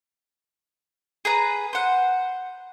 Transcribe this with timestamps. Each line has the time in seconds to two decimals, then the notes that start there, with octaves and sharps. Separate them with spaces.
1.25 G#4 B4 A#5
1.73 C5 F#5